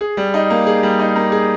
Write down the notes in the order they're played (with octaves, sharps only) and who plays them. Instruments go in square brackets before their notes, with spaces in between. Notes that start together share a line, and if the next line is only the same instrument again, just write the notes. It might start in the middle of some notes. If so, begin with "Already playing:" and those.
[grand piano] G#4
G3
D#4
A#3
G#4
G3
D#4
A#3
G#4